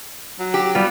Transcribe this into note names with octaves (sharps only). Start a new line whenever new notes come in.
F#3
G4
G3 B3 F4